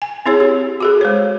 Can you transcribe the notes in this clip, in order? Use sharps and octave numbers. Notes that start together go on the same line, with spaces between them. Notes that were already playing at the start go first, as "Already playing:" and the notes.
G#5
C4 E4 G#4 C#5
G4
F#4 G#4 A4
G#3 C5 C#5